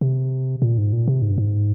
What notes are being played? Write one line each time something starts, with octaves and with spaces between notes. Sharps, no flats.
C3
A#2
G#2
A#2
C3
G#2
G2
G#2